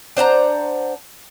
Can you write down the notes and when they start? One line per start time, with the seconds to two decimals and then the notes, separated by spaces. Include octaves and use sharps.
0.17 D4 C5 F#5 A#5